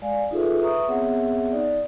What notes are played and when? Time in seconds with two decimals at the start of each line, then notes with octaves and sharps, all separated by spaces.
0.02 G#3 D5 F5 G#5
0.31 D#4 F4 G#4 A4 B4 E5
0.61 B4 E5 A#5 C#6 D#6
0.88 B3 C4 G#4 C#5 E5 F#5
1.52 D#4 D5